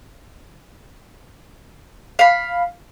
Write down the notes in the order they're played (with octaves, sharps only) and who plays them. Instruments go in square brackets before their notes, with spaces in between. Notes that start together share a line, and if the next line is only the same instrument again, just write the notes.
[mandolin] F5 B5